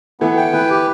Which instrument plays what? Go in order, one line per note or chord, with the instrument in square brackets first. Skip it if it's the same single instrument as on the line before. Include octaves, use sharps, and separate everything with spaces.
[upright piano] E3 A3 [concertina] B3
[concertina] G5
[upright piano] E3 [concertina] B4
[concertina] G4